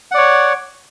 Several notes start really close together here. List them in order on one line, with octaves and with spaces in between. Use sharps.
F#5 D5 C#5